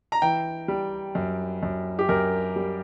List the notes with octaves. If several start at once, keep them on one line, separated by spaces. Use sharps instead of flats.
A#5
E3 G5
G3
F#2
F#2
G4
F#2 A#4
G3